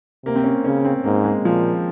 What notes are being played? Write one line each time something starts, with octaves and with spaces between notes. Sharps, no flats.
C3 A#3
C4
C#4
C#3 C#4
C4
G#2 A#3
G#3
A#2 F3